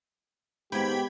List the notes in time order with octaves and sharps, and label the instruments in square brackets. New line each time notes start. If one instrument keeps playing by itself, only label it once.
[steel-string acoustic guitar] D#2 G#2 [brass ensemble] G#3 B3 G4 [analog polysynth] G5 B5 G#6